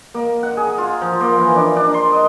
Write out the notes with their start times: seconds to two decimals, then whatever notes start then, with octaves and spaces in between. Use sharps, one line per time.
0.14 A#3
0.43 F#5
0.57 G#4
0.78 F4
1.01 F3
1.21 A#3
1.38 E3
1.56 D4
1.76 D4
1.94 C6
2.12 D#5